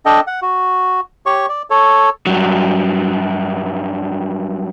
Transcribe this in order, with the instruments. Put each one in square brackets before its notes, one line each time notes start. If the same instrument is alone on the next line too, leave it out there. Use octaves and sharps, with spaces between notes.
[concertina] D4 A4 D#5 G5
F#5
F#4
G4 C#5 C#6
D5
A4 C#5
[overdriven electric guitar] G2 F#3